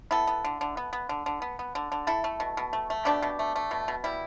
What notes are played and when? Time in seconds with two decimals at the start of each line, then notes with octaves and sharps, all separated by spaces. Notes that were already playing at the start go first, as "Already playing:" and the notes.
0.11 B3 E4 A4
0.27 B3
0.44 D3
0.61 D3
0.77 B3
0.93 B3
1.09 D3
1.26 D3
1.42 B3
1.59 B3
1.75 D3
1.92 D3
2.07 A3 E4 A4
2.24 A3
2.40 B2
2.57 B2
2.73 A3
2.90 A3
3.05 B2 D4 G4
3.22 B2
3.39 A3
3.56 A3
3.71 B2
3.88 B2
4.04 G3 E4